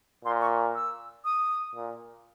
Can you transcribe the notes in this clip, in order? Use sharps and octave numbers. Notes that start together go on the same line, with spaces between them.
A#2 C6
C#6
E6
D#6
A#2